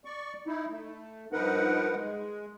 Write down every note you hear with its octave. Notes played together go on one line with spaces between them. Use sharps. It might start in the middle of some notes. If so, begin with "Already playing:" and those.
D5 C#6
D#4 E4
A3
G2 F3 D#4 A#4 B4 F#5
G#3